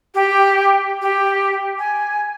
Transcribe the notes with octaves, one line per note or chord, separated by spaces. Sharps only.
G4
G4
G#5